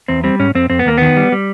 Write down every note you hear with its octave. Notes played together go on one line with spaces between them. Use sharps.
E2 C4
G3 C4
G#2 C#4
F2 C4
F2 C4
B3
D#2 A#3
D#3 B3
G3
G3